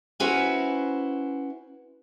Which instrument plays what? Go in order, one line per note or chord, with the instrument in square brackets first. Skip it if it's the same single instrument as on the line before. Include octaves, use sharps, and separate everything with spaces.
[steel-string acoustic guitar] C#4 E4 F#4 B4 C5